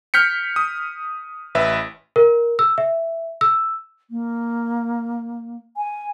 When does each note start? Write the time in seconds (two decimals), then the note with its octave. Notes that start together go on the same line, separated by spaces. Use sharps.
0.14 F6 G6 B6 C#7
0.56 D#6
1.55 A1 B4 E5
2.16 A#4
2.59 E6
2.78 E5
3.41 E6
4.10 A#3
5.77 G#5